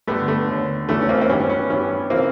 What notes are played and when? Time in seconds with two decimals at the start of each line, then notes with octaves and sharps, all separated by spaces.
0.07 G2 D3 A3 B3
0.28 A3 B3
0.48 D#2 D3
0.89 E2 C#3 E3 A3 B3
1.01 C#4
1.09 A#3 C4
1.21 C4
1.29 G2 D#3 B3 C#4
1.49 B3 C#4
1.70 G2 E3 B3 C#4
2.10 C#3 E3 A#3 C4